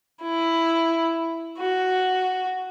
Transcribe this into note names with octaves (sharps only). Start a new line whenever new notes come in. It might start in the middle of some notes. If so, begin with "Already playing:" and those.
E4
F#4